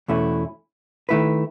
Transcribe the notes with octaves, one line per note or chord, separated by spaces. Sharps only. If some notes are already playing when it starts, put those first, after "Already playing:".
E2 B2 A3 C#4 E4
D#3 A3 E4 B4